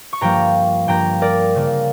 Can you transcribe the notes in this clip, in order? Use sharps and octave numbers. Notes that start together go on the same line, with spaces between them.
C#6
G2 F3 A#3 G5 A#5
G2 F3 A#3 G5 A#5
A#4 D5
C#3 F3 A#3